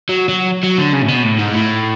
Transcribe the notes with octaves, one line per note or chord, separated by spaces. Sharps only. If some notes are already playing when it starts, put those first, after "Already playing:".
F#3
F#3
F#3
D3
C#3
A2
B2
A2
G#2
A2